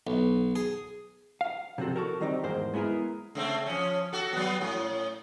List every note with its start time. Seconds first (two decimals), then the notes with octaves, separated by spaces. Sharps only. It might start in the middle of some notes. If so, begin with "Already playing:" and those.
0.07 B1
0.56 G#4
1.41 F5
1.78 C3 F3 C4 F#4 A4
1.96 F#4 A4 A#4
2.21 D#3 G3 C4 D#4 G4
2.43 E2 G#2 A#3 C5
2.74 G#3 B3 E4 G#4 A#4
3.35 C#3 A3 C4
3.66 F3 C#4
4.13 F#4 A4
4.33 F#3 B3
4.61 A2 C#4